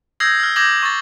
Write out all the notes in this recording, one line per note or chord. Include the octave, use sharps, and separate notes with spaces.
D#6 E6 G6 G#6 A#6 C7
E6 F6
D6 G6 G#6 A#6 F#7
C#6 A6